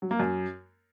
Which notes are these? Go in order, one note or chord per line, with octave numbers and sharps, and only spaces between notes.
F#3
A#3
F#2